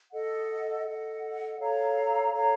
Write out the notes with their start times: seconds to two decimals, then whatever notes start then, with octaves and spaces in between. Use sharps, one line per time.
0.11 A4 D#5 F#5
0.85 A4 D#5 F#5
1.59 A4 C#5 F5 A#5
2.33 A4 C#5 F5 A#5